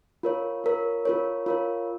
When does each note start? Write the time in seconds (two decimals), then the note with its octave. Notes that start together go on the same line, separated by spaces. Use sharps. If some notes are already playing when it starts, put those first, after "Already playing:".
0.23 F4 A#4 C#5
0.64 F4 A#4 C#5
1.05 F4 A#4 C#5
1.46 F4 A#4 C#5